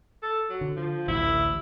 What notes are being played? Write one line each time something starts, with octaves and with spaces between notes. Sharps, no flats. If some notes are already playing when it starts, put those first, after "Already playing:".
A4
F#3
D3
F3
A1 D2 E4